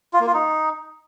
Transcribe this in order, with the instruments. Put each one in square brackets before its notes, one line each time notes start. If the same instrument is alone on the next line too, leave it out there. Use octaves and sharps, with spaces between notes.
[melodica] F4
A#3
F4
D#4